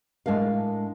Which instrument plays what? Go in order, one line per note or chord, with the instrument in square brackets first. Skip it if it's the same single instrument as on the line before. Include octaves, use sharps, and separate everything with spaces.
[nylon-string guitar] A2 G#3 D4 A#4 F5